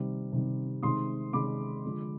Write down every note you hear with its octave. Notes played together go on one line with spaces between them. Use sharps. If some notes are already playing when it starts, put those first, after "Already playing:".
Already playing: C3 D#3 G3
C3 D#3 G3
C3 D#3 G#3 C6 D#6
C3 D#3 G#3 B5 D6
D3 F3 G#3